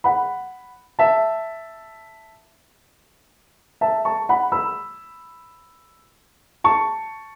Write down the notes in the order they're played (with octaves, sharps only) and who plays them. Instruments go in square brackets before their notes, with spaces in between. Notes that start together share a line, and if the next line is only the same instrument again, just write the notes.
[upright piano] F#5 B5
E5 A5
E5 A5
A5 C#6
F#5 B5
B5 E6
A5 C#6